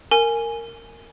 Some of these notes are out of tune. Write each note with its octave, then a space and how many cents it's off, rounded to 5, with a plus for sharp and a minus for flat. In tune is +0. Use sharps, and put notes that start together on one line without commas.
A#4 -15 G#5 +0